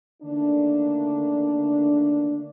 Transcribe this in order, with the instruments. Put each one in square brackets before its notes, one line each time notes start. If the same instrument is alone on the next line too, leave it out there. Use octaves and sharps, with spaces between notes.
[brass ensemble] D3 D#3 A3 A#3 D4